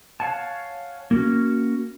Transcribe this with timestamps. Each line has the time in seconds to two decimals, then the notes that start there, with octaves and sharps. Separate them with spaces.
0.20 C#5 F5 F#5 G#5 A5
1.11 A#3 C#4 F#4